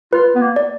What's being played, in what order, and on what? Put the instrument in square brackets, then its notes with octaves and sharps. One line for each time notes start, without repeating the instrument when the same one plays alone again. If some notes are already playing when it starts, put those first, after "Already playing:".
[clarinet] F4 [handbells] B4
[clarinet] B3
A#3
[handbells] D5